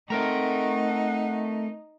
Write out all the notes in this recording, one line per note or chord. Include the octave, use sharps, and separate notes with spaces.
A3 C4 D#4 A4 A#4 F#5 A#5